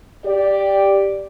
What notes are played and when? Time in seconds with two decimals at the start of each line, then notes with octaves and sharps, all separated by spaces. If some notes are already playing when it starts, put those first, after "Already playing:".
0.25 G4 D5